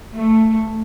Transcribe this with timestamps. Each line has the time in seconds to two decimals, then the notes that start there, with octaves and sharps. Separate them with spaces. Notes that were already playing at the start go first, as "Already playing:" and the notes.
0.15 A3